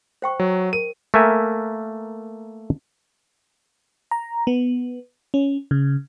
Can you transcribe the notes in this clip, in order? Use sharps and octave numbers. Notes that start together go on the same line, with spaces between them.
C5 G5 C#6
F#3
A#4 D#7
A3 A#3 A#4 E5 G#5
A#5
B3
C#4
C#3